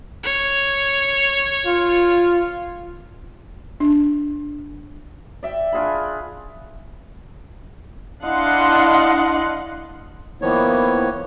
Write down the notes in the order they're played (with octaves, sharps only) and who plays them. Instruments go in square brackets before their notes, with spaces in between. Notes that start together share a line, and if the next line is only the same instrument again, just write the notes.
[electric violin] C#5
[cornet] F4
[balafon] D4
[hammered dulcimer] D5 E5 G5
D4 F4 G#4 B5
[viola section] D4 E4 D#5 F5 F#5 C6
[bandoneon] D#3 F3 C#5 [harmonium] A#3 B3 E4